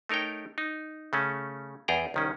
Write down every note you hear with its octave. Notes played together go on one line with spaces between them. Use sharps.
A3 D#4 A#4 C#5 G5
D#4
C#3 A3 C#4
E2 G#4 D5 G5 A#5
C2 D#3 C#4